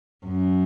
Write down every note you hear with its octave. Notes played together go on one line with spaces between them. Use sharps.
F#2